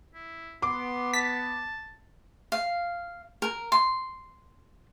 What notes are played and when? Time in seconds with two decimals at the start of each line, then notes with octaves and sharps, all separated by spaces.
0.15 E4
0.62 B3 C6 D6
1.14 A5 B6
2.52 F5
3.42 A#4
3.72 C6